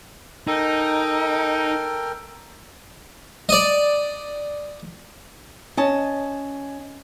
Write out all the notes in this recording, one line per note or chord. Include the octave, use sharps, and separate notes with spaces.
D#4 A4 A#4 G5
D5 D#5
C#4 D#5 A5